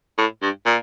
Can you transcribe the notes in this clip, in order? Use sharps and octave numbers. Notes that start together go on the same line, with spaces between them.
A2
G2
A#2